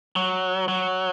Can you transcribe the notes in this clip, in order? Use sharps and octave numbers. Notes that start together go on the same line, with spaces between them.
F#3
F#3